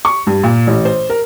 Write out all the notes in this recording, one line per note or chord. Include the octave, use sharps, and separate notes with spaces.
C#6
G2
A#2
A1
C5
A#4